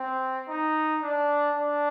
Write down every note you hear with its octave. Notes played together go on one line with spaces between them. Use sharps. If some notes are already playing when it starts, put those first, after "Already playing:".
Already playing: C4
D#4
D4
D4